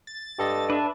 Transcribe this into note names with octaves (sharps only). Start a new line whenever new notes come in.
A6
G2 G4 A4 D#5
D4 B4 E5